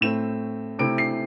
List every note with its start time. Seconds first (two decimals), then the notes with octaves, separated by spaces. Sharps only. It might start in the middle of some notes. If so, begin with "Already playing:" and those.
0.01 A2 A3 C4 E7
0.79 C3 A3 C4 E4 D7
0.98 C7